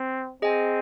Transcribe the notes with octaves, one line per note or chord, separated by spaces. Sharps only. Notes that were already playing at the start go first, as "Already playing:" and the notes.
Already playing: C4
C4 G#4 D#5 G#5